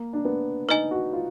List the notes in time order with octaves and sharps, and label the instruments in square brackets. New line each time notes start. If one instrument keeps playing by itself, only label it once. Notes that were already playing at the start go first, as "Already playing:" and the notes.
Already playing: [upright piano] A#3
D4
B3
[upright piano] D#4 [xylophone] B4 D#5 G#5
[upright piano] F#4
F4